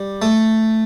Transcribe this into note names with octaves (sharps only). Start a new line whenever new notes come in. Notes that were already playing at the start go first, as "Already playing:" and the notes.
Already playing: G3
A3